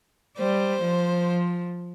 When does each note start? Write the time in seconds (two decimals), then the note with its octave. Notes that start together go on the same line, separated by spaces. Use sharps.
0.38 G3 C5
0.83 F3